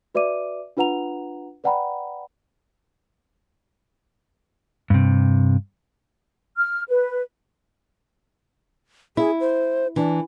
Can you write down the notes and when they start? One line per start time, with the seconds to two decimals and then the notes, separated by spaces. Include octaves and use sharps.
0.15 F#4 B4 D5 E5 D6 D#7
0.77 D4 F4 B4 F#5 A#5 F7
1.64 B4 D5 F#5 G5 A#5 B5
4.90 G2 C3
6.57 F6
6.89 B4
9.17 E4 G#4
9.40 C5
9.96 E3 D4